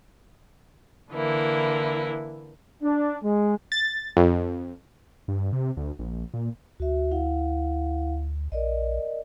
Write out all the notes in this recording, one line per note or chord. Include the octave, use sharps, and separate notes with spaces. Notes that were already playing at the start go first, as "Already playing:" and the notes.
D3 E3 A#3 E4
D4
G#3
A6
F2
G2
C3
D2
A#1
A#2
D2 F#4 E5
E4 F5 F#5
A#1 A#4 D5 D#5